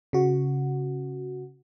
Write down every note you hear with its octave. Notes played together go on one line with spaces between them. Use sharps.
C#3 F#4